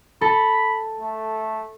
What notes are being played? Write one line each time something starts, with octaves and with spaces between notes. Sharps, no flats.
A4 B5
A3